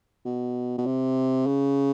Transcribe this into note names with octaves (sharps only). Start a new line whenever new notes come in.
B2
B2
C3
C#3